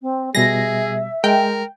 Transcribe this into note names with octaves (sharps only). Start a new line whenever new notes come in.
C4
B2 G3 G#4 E5 A#6
G#3 A#4 G5